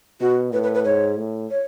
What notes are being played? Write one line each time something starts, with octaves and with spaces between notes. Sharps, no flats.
B2 F#4
A2 B4
B4
B4
G#2 C#5
A2
C#5